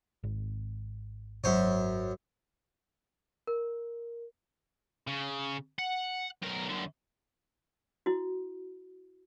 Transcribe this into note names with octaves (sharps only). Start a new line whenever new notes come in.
G#1
G#1 F#2 F#3 C5 C#5
A#4
C#3
F#5
B1 A#4
F#2 D3
E4 F#4